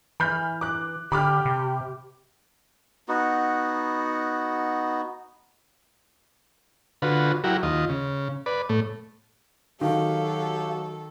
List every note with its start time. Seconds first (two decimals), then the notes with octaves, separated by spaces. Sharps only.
0.20 E3 B5 F6 G6
0.61 D6 F#6
1.12 D3 G4 B5 D6 F6
1.45 C3
3.08 B3 D#4 F#4
7.02 D3 F4 F#4 B4
7.44 F#3 E4 F#4 G4 A#4
7.63 D#2 F4 D#5
7.89 C#3
8.46 B4 D5
8.69 A2 A3
9.81 D#3 F#3 F#4 G4 A4 F5